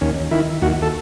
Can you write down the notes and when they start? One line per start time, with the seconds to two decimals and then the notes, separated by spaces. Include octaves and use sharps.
0.01 D#2 C#4
0.31 D#3 E4
0.62 D#2 F#4
0.82 A4